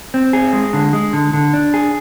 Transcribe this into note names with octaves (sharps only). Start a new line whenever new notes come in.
C4
G#4
G#3
D3
G#3
D3
D3
D4
G#4